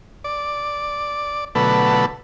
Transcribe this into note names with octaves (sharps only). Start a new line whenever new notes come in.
D5
B2 D3 F#3 A3 A4 B4